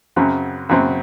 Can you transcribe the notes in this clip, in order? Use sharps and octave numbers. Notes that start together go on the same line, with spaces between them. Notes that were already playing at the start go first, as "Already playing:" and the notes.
F#2 C#3 F#3 C4
F#2 C#3 F#3 C4